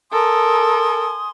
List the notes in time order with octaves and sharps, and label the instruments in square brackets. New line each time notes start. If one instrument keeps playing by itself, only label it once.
[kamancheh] A4 A#4 [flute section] G#5 C6 D#6